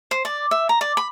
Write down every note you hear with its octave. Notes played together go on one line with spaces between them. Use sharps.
C5
D5
E5
A#5
D5
B5